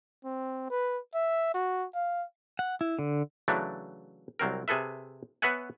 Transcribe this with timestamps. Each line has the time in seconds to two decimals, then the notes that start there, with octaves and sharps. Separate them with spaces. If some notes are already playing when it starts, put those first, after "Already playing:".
0.25 C4
0.70 B4
1.14 E5
1.54 F#4
1.95 F5
2.59 F#5
2.81 E4
2.99 D3
3.48 C#3 E3 F#3 A3 D4
4.39 C2 F#3 C4 A#4
4.68 C3 G#4 A4 B4 E5
5.42 B3 B4 C#5 E5 F#5 G#5